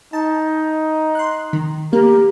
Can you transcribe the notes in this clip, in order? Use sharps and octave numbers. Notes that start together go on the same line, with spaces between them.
D#4 A5
C6 F#6
D#3
A#3 G4 A#4